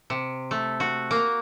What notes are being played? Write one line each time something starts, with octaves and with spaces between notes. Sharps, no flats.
C3
A3
F#4
A#3